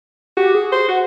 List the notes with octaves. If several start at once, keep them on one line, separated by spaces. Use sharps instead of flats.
F#4 G4
G#4
C5
F#4 F#5